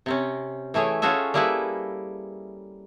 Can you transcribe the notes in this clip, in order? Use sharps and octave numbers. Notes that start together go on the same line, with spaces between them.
C3 C4 C#4
E3 A3 E4 G#4 C#5
C#4 F4 F#4 G#4 A4 E5
G3 A#3 E4 G#4 A4 B4